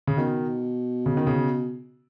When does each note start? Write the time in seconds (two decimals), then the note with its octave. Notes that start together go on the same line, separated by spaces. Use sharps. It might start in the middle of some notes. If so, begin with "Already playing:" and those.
0.07 C#3
0.17 B2 D#3
1.06 C#3
1.17 D#3
1.27 C#3